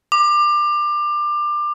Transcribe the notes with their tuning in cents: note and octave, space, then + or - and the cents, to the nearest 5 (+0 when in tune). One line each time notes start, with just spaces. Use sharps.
D6 +25